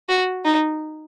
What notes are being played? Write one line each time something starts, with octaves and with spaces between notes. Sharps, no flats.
F#4
D#4